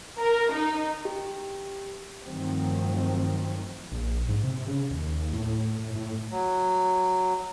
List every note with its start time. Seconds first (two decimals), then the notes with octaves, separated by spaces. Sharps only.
0.19 A#4
0.52 D#4
1.05 G4
2.22 G2 D#3 F3 F#3 A3 C4
3.92 A#1
4.28 G#2
4.44 C3
4.67 C#3
4.90 D#2
5.33 A2
5.79 A2
5.96 A2
6.31 F#3